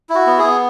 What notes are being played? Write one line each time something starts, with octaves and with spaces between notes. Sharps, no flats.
E4
F#4
B3
G#4
B3